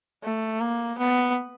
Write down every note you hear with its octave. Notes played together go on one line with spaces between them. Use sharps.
A3
A#3
B3